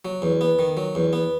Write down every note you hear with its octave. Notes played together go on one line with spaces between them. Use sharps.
F#3
E2
B3
D#3
F#3
E2
B3